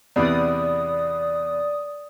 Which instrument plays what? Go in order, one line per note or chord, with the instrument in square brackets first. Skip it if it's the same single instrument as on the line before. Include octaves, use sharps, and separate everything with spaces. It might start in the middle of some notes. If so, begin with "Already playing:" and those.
[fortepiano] E2 C3 B3 [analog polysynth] D5 D#6